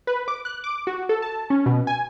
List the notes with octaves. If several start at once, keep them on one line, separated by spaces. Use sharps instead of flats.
B4
D6
F#6
D6
F#4
A4
A5
C#4
B2
G#5